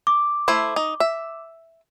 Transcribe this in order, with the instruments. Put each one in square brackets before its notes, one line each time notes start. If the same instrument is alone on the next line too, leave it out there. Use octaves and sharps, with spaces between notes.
[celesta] D6
[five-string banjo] A3 E4 C5
D#4
E5